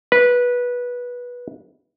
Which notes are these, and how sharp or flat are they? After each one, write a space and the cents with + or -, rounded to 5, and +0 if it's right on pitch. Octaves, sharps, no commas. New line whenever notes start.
B4 -15